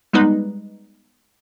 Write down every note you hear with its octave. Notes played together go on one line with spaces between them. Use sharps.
G3 G#3 B3 D#4 B4